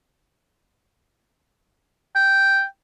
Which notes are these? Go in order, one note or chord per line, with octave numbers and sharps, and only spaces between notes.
G5